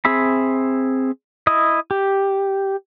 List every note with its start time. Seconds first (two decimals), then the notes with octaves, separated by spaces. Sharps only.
0.05 C4 G#4 E5 B5
1.47 E4 D#5
1.91 G4